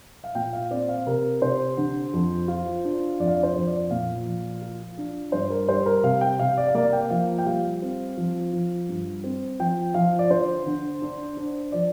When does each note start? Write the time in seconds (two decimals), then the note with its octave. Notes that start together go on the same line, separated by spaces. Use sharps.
0.24 F5
0.35 A#2 G5
0.53 F5
0.71 C4 D5
0.89 F5
1.06 C3 A#4
1.41 C3 C5
1.77 D3
2.14 F2
2.48 F4
2.84 D4
3.19 F2 D5
3.27 F5
3.35 D5
3.43 C5
3.56 F2
3.67 D5
3.90 A#2 F5
4.26 F3
4.62 F4
4.98 D4
5.32 G2 C5
5.50 A#4
5.68 G3 C5
5.86 A#4
6.03 C3 F5
6.21 G5
6.39 C3 F5
6.57 D5
6.68 F5
6.75 A#3 D5
6.93 G5
7.10 F3 F5
7.38 G5
7.46 G3 F5
7.82 C4
8.17 F3
8.53 F3
8.89 G2
9.24 C4
9.59 F3 G5
9.94 F3 F5
10.19 D5
10.30 D3 C5
10.66 D3
11.02 D4
11.37 D4
11.72 F3 D5